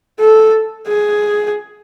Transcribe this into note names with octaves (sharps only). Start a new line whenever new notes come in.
A4
G#4